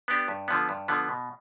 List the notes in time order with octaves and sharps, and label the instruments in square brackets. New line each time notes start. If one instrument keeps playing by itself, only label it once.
[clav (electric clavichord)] B3 D4 G4
G2
D3 F3 B3
G2
D3 F3 B3
B2